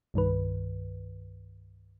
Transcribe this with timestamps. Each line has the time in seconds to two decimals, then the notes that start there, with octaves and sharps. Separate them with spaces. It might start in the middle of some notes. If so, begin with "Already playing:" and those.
0.14 C2 G2 D#3 B4